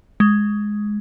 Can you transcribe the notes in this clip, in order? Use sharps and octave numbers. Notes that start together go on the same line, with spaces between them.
G#3